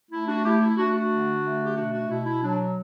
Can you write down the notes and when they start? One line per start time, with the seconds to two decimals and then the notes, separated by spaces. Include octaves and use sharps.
0.11 A3 E4
0.27 D4 F#4
0.44 A3 E4 G4
0.61 E4
0.77 A3 D4 F#4
0.93 D4 F#4
1.10 D3
1.43 A3
1.65 G4
1.76 B2 D4 F#4
1.92 D4 F#4
2.09 B2 E4
2.25 E4
2.41 F#3 D4